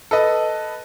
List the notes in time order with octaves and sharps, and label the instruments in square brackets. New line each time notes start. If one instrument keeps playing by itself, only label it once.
[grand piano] A4 B4 D#5